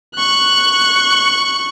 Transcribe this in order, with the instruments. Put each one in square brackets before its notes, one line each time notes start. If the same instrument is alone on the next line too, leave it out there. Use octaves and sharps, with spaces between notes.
[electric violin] C#6 F#6